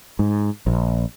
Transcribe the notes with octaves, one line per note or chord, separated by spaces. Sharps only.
G#2
A#1